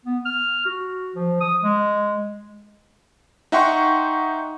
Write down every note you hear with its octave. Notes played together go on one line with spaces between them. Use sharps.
B3
F6
F#4
F3
D#6
G#3
D#4 E5 F#5 G5 C6 C#6